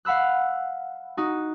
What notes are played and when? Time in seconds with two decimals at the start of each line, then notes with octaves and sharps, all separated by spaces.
0.05 F5 F#5 B5 E6 F#6
1.17 D#4 F#4